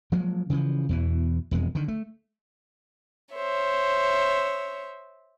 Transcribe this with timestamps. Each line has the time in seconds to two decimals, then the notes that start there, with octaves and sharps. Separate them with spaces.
0.12 F3 F#3 G#3 A#3
0.50 C#3 E3 F3
0.89 E2 B2 E3
1.51 E1 F2 G#3
1.75 D3 D#3
1.88 A3
3.34 C5 C#5 E5